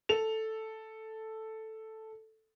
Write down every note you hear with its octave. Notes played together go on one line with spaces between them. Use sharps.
A4 F7